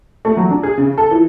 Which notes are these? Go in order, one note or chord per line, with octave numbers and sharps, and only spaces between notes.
A3
F#3
D4
G#4
C#3
A4
E3